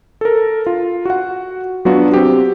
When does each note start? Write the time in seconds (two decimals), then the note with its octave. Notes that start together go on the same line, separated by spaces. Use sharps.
0.21 A4 A#4
0.66 F4
1.05 F#4 F#5
1.85 F#3 B3 D4 F4 F#4
2.14 C4 G4